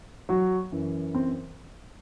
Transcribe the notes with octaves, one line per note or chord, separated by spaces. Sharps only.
F#3 F#4
F#2 E3
C4